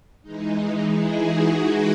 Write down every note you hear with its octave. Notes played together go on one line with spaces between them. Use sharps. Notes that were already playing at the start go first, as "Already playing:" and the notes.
E3 G#3 D#4
E4 G#4
F#4
B4 D#5